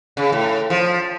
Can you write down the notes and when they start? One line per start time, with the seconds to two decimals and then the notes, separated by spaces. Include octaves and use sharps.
0.17 C#3
0.32 A2
0.70 F3